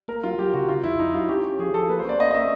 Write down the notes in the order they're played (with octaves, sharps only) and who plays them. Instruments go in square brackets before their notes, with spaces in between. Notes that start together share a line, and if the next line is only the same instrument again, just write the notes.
[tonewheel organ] A#3 [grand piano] A#4
[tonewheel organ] F#3 [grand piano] F4
[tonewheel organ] F#3 [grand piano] G4
[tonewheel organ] C#3 [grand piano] F#4
[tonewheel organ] C#3 [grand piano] F4
[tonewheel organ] F2 [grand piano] E4
[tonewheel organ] F2 [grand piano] D#4
[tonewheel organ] F#3 [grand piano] F4
[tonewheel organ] C#4 [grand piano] G4
[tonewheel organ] C#4
[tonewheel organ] F3 [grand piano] G#4
[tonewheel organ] F3 [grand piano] A4
[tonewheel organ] A#3 [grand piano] B4
[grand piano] C5
[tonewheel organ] C#4 [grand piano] D5
[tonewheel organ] A#3 [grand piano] D#5
[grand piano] D#5
[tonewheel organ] C#4 [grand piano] E5